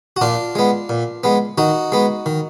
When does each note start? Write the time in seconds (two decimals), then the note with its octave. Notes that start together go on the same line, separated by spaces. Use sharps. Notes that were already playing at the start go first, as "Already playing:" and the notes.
0.17 F#4
0.21 A#2 D4 F4
0.55 G#3 B3
0.89 A#2
1.24 G#3 B3
1.58 D#3 D#4 F#4
1.92 G#3 B3
2.26 D#3